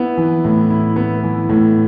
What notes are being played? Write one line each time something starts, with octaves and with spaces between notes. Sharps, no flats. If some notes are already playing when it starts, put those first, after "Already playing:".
Already playing: B3 E4
E3
A2
E4
B3
E3
A2